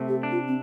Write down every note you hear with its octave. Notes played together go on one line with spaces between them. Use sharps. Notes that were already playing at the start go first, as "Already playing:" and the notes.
Already playing: C3 A3
G4
D4
F4
C4